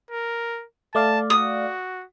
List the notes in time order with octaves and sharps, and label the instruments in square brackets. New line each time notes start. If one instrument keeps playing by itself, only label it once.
[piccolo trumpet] A#4
[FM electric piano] A3 D5 F5 [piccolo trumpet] A5
[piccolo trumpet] F#4 [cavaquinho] D#6